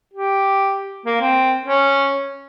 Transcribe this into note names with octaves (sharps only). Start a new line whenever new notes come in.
G4
A#3
C4
C#4